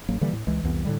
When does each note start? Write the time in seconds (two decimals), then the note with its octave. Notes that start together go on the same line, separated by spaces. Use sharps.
0.09 A1 F#3 A#3
0.21 D3 E3 G3 A#3
0.33 A2
0.47 C#2 E3 G#3
0.63 C2 F2 E3 B3
0.85 A2 D3 G3